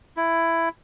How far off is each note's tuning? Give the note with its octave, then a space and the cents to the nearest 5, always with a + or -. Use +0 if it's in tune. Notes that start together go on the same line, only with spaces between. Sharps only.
E4 +10